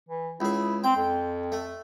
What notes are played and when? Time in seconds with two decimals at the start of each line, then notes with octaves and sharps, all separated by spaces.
0.09 E3
0.40 C#2 E4 G#4
0.84 C4 G5
0.96 F2
1.52 A3